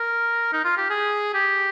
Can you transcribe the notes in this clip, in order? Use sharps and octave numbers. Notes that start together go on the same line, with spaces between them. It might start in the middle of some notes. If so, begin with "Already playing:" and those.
Already playing: A#4
D#4
F4
G4
G#4
G4